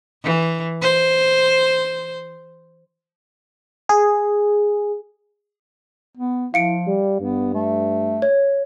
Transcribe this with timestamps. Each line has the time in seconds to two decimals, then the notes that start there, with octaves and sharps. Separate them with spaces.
0.24 E3
0.82 C5
3.89 G#4
6.17 B3
6.54 F3 E4 F5 C#7 D7
6.87 G3
7.20 G2 B3
7.54 A3
8.22 C#5